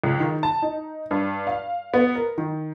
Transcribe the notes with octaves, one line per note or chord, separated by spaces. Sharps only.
C#2
D#3
A5
D#4
G2
F5
B3
A#4
D#3